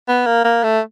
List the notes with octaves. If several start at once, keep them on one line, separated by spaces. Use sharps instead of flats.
B3
A#3
A#3
A3